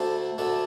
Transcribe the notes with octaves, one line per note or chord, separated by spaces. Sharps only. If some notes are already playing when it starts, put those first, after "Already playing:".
Already playing: D2 D3 A3 C5
D2 D3 A3